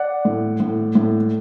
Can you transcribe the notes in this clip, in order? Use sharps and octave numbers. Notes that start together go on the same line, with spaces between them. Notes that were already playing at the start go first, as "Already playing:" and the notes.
Already playing: D5 F#5
A2
A2
A2